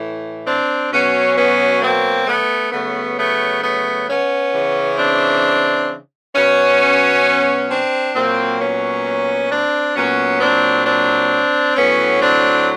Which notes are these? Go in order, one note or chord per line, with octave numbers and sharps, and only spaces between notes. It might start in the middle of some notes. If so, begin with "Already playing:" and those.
Already playing: A2 E3
C4 D4
B2 F#3 B3 C#4
B3 C#4
A#3 C4
A3 B3
C#3 F#3 A3 B3
A3 B3
A3 B3
B3 C#4
C#3 E3
C4 D4
B2 F#3 B3 C#4
C4 D4
A#2 F#3 A#3 C4
B3 C#4
C4 D4
A#2 F#3 B3 C#4
C4 D4
C4 D4
A2 F#3 B3 C#4
C4 D4